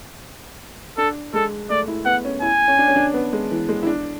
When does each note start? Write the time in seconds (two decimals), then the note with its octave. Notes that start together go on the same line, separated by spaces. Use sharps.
0.98 D4 A4
1.33 G#3 A4
1.70 A3 D5
1.88 E4
2.06 B3 F#5
2.25 C#4
2.42 E4 G#5
2.68 C#4
2.79 D4
2.88 C#4
2.96 D4
3.14 B3
3.33 G#3
3.51 E3
3.69 G#3
3.83 E4
3.87 D4